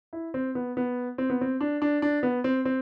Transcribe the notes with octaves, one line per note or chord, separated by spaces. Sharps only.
E4
C4
B3
B3
C4
B3
C4
D4
D4
D4
B3
C4
C4